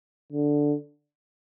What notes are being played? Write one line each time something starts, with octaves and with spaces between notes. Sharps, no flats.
D3